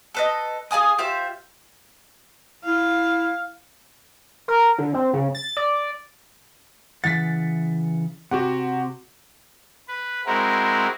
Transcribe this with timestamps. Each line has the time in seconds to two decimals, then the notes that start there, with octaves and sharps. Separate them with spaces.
0.14 A4 B4 D#5
0.71 G#4 F5 G#5 D#6
0.98 F4 G4 C5 E5
2.65 E4 F5
4.48 A#4
4.78 D3
4.94 C4
5.13 C#3
5.35 A6
5.57 D5
7.04 C#3 E3 F#5 A6 B6
8.31 C3 F#4 G4 F#5
9.88 B4
10.26 G#3 C4 E4 F#4 A#4